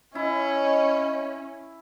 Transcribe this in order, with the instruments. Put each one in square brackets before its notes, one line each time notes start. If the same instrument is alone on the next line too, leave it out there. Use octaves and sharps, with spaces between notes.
[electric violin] C#4 [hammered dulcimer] E4 [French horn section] C#5 D#5